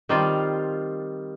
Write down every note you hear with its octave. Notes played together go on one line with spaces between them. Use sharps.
D#3 G3 C4 F4